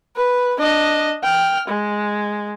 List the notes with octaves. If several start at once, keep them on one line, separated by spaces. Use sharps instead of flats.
B4
D4 D#5
G5 F6
G#3